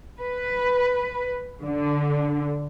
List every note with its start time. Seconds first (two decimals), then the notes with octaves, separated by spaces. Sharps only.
0.20 B4
1.63 D3